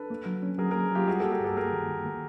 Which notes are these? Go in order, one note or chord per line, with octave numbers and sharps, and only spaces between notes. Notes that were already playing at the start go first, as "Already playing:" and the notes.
Already playing: D4 A4 B4
A#3
F#3
C#4
F#3 G#4 A#4
A#3 G#4 A#4
F#3 F4 G4
G3 F#4 G#4
A#3 G4 A4
G#4 A#4
G2 G4 A4
A#3 G#4 A#4
D#3
D#3
A#3